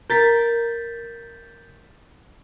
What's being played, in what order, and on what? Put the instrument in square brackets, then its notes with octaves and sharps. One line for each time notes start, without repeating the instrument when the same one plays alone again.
[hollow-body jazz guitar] A#4 [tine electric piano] G6 A6 B6